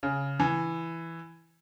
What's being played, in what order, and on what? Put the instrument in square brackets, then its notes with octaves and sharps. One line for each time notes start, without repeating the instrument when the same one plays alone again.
[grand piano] C#3
E3